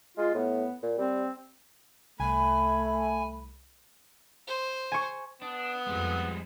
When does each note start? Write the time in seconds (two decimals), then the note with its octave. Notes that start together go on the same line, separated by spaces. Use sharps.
0.18 G#3 F4
0.35 A2 B3
0.83 A#2
0.98 G3 C4
2.20 C2 A3 G#5 B5
4.48 C5
4.92 G#5 C#6
5.42 B3 D4 D#6
5.87 F2 G3 G#3